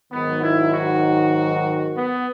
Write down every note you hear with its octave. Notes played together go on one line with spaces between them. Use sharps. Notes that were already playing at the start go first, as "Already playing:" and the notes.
G#2 D#3 F#3 B3
E4
F#4
B3